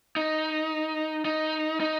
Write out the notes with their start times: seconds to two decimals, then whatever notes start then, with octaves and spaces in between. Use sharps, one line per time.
0.16 D#4
1.25 D#4
1.80 D#4